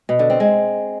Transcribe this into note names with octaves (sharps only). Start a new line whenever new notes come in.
B2
D3
C4
G#3